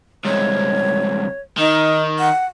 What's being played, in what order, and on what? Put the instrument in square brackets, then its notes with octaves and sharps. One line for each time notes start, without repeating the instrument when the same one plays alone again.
[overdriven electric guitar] C2 G#2 [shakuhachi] C#5
[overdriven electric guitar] D#3 [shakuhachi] D#4
[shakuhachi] F#5